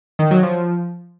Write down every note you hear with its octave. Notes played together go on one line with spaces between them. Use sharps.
D#3
F#3
F3